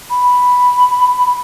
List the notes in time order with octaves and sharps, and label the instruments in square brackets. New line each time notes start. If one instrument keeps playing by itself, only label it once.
[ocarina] B5